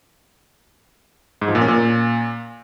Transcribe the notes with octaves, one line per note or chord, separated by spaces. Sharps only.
G#2
F3
A#2
C#4
A#2